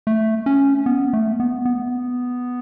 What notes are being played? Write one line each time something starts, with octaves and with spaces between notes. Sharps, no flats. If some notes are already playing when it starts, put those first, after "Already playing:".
A3
C#4
B3
A3
B3
B3